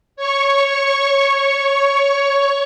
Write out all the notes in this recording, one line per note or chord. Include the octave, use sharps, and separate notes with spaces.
C#5 C#6